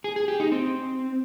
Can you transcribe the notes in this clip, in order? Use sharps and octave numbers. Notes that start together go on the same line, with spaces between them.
G#4
G#4
G4
D#4
C4